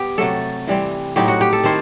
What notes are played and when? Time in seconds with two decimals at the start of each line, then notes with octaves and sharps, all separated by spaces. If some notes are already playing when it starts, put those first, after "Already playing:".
Already playing: B3 G4
0.18 C3 F#3 A3 A4
0.67 E3 G3 C4
1.16 A2 F#3 C4 D#4 G4
1.28 F#4
1.41 G4
1.53 A4
1.64 D#3 A3 C4 E4 C5